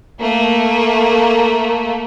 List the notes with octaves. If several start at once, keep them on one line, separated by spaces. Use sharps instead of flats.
A3 A#3